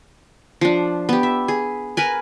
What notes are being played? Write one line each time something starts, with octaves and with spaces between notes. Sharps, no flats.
F3 D4
B3 G4
E5
G#4
A#4 B4 G#5